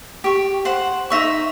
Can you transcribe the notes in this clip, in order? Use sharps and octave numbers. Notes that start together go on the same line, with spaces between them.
G4 C#6
C5 F#5
D#4 E5 C#6